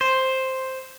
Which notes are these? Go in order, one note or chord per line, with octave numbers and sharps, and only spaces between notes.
C5